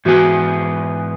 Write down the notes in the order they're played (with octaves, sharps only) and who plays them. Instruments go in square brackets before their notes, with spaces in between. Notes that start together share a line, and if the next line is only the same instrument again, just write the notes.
[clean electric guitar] G#2 E3 B3 G#4 B4 [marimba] F#4